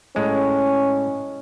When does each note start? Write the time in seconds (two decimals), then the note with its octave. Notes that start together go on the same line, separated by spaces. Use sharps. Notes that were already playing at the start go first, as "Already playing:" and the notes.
0.16 A2 G#3 C#4